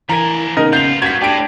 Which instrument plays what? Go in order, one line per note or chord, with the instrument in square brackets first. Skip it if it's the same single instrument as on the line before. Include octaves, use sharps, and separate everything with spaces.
[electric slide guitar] E3 A#4 [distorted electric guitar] F3 G#5 [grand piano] A#5
[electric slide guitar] C#3 A#3 B3 [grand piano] D#4 A#4 D#5
[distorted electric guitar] D#2 F4 [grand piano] G6 F7
[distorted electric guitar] G2 [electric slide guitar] F#4 [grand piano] G#6 B6
[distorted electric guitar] A2 [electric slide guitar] D4 [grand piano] G4 D7